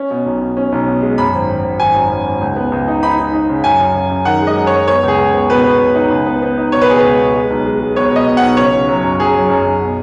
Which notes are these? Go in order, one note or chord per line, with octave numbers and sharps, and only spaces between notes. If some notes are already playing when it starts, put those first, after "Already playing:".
Already playing: C#4
B2
B1
B2
C#4
B1
B2
G#3
F#2 B5
G#1
G#1
G#1
G#1 G#5
F#2
F#2
G#1
C#2
B3
C#2
D#4
D#4 B5
D#4
D#4
C#3
F#2 G#5
F#2
F#2
F#2
D#3 F#5
G#3
D#5
F#2
C#5
F#2
B3 C#5
C#2
G#4
C#2
B3
B2 B4
B3
B2
D#4
C#2
B3
B3
D#4
B2 C#5
B4
B2 G#4
C#2 B4
B2
G#3
B1
G#3
G#3
B3 C#5
B2 D#5
B2
F#5
B1
C#3 C#5
C#3
F#3
F#2
F#3 G#4
F#3
F#2
F#2
B2